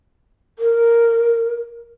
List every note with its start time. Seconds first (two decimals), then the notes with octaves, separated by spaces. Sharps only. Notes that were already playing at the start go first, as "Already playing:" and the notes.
0.59 A#4